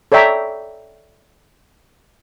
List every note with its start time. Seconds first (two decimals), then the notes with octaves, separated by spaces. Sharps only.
0.12 A4 C#5 D5 E5 G5 A#5